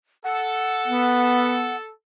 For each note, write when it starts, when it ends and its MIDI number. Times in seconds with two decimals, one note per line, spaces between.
0.24 1.91 69
0.24 1.76 78
0.87 1.76 59